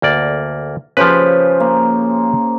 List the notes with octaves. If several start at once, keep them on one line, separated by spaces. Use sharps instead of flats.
D2 A#3 D5
C#3 F3 G4 B4 C5
A#3